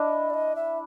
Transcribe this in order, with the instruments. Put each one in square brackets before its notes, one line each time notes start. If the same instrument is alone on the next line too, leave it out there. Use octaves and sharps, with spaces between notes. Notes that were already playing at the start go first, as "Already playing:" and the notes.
Already playing: [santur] D4 E4 [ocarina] D#5
[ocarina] D5
D#5
E5